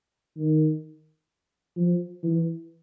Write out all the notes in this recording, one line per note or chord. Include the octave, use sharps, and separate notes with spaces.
D#3
F3
E3